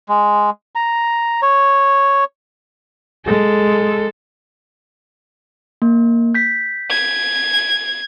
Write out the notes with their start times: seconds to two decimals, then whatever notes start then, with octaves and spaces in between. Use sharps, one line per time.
0.09 G#3
0.75 A#5
1.42 C#5
3.26 G#3 A4
5.82 A#3
6.35 G6 B6
6.90 G#6